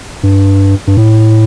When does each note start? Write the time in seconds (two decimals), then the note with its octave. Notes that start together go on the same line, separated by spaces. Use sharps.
0.23 G2
0.87 G2
0.97 A2